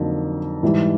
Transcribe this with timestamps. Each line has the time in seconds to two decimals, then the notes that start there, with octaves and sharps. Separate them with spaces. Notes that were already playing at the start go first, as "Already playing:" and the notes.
Already playing: F2 D3 F#3 A#3 D#4
0.63 G#2 E3 G3